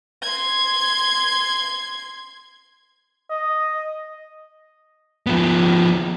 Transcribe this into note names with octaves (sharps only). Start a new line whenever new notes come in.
C6 G#6
D#5
F3 B3